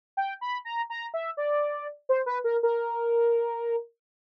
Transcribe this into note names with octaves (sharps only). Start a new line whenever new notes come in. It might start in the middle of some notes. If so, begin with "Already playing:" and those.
G5
B5
A#5
A#5
E5
D5
C5
B4
A#4
A#4